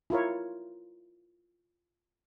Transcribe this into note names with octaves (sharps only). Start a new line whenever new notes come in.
E4 F4 A#4 C#5